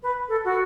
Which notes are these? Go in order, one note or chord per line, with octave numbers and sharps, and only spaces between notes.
B4
A4
F#4